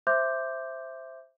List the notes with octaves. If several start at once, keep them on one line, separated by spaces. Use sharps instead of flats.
C5 E5 C6 D6 G6